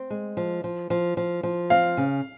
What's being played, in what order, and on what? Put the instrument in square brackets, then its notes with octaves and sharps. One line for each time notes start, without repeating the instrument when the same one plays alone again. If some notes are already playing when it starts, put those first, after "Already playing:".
Already playing: [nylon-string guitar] C4
G#3
F3
F3
F3
F3
F3
[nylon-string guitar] C4 [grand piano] F5
[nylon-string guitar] C#3